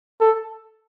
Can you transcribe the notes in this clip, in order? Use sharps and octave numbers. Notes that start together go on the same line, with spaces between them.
A4